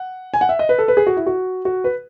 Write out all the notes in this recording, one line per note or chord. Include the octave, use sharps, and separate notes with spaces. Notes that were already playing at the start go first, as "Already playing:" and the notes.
Already playing: F#5
G#5
F#5
E5
D#5
B4
A4
B4
G#4
F#4
E4
F#4
F#4
B4